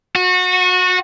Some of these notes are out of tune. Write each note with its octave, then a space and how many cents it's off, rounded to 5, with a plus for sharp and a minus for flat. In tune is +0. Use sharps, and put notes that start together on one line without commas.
F#4 -25